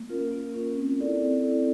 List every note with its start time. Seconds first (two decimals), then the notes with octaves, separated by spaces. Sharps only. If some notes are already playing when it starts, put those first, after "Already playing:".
Already playing: A#3
0.09 C#4 F4 A#4
0.31 A#3
0.54 C#4 F4 A#4
0.76 C4
0.98 E4 A4 D5
1.21 C4
1.42 E4 A4 D5